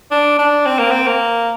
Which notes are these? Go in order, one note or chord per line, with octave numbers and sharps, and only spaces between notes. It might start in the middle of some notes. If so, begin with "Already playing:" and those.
D4
D4
C4
A#3
C4
A#3